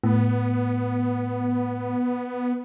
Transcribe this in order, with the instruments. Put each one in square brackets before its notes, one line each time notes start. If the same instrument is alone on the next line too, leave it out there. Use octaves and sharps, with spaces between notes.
[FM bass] A2 [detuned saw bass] B3